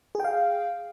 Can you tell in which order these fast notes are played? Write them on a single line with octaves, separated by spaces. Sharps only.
G#4 G5 F5